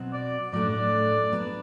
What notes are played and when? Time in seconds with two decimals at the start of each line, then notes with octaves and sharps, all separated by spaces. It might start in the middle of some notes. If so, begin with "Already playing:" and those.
Already playing: B2 F#3 C4 F#4
0.13 D5
0.52 A2 F#3 A3 D4 D5
0.72 D5
1.32 F#3 B3 D4